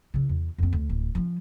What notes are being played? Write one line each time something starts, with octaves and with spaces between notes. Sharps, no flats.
C#3 E3
E2
F2 C4
D2
D1
F3 C#4